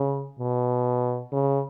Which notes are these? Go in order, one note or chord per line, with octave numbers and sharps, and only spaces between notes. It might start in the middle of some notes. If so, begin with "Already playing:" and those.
Already playing: C#3
B2
C#3